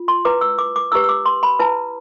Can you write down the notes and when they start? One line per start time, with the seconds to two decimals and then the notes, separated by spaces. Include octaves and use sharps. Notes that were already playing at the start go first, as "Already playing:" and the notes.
Already playing: F4
0.08 C6
0.25 E4 B4 D6
0.41 E6
0.58 D6
0.76 D6
0.92 E4 G4 B4 E6
1.04 E6
1.09 D6
1.25 C6
1.43 B5
1.59 E4 B4 A5